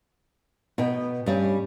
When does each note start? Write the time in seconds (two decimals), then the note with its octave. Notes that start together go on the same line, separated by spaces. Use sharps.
0.78 B2 B3 G5
1.26 G2 G3 C#4